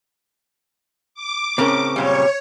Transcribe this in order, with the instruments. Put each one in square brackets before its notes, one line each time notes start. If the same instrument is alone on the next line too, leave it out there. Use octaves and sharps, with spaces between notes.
[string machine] D6
[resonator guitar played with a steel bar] A2 C#4 A#4 [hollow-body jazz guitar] C#3 C4
[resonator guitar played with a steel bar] F#2 A#2 G3 [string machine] C#5